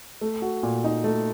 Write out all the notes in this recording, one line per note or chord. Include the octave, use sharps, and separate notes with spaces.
A3
F#4
A#2
D#4
A3